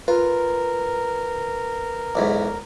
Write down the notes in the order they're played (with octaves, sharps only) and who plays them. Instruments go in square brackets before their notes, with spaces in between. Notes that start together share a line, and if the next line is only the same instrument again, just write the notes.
[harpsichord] F4 [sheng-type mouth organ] A#4 [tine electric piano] B4
[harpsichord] B1 E2 G#2